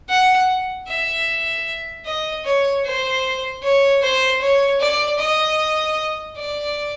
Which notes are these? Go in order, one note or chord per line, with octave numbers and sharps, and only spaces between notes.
F#5
E5
D#5
C#5
C5
C#5
C5
C#5
D5
D#5
D5